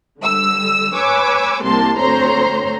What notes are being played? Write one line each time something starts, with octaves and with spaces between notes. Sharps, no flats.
D3 G3 E6
B4 C#5 G#5 D6 E6
C2 C3 A#3 A5 C6
D2 C4 C5 C#5 A#5 C6